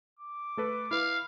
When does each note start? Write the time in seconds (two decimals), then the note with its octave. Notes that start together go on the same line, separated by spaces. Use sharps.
0.19 D6
0.57 A3 A4 B4
0.91 E4 B4 F5